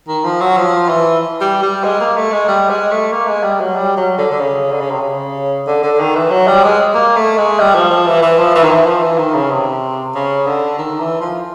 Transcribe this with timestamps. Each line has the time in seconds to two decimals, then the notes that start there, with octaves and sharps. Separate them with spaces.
0.08 D#3
0.24 F3
0.41 F#3
0.57 F3
0.89 E3
1.41 G3
1.63 G3
1.84 G#3
2.00 A#3
2.16 A3
2.32 G#3
2.48 G3
2.70 G#3
2.91 A3
3.12 A#3
3.27 G#3
3.43 G3
3.60 F#3
3.76 G3
3.97 F#3
4.18 D3
4.31 D3
4.40 C#3
4.71 D3
4.80 C#3
4.90 C3
5.01 C#3
5.67 D3
5.83 D3
6.00 D#3
6.15 E3
6.31 F#3
6.47 G3
6.64 G#3
6.94 A#3
7.16 A3
7.37 G#3
7.60 G3
7.75 F3
7.90 F3
8.06 E3
8.22 E3
8.39 F3
8.55 E3
8.63 D#3
8.71 E3
8.86 F3
9.02 E3
9.18 D#3
9.35 C#3
9.51 C3
10.15 C#3
10.47 D3
10.78 D#3
11.00 E3
11.20 F3